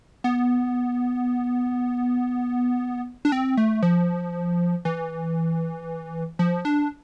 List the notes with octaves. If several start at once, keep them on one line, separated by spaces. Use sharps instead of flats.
B3
D4
C4
A3
F3
E3
F3
D4